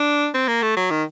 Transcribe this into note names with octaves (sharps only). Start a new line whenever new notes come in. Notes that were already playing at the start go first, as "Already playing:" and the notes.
Already playing: D4
C4
A#3
A3
F#3
D#3